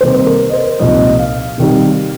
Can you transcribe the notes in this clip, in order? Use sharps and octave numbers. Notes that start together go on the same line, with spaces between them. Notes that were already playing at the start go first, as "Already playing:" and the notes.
C3 D#3 G3 A#3 D#4 C5
A#4
D#5
C5
C2 A#2 F3 A#3 D#4 D#5
D#5
F5
C3 D#3 G3